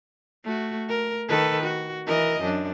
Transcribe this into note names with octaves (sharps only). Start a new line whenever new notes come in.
A3 F#4
A#4
D#3 A4 B4
F#4
E3 A#4 D#5
F#2 D4